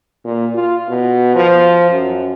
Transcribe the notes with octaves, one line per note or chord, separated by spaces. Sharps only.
A#2
F4
B2
F3
F#2